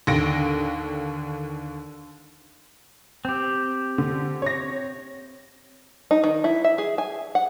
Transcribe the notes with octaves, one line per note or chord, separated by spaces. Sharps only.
D#2 D3 A#6 D7
C4 G4
D3
C#5 A#6
D#4
D#3
E4
E5
G#4
G#5
F#5